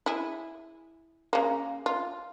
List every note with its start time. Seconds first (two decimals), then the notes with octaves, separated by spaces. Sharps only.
0.06 E4 G#4
1.33 C#3 A#3
1.86 F4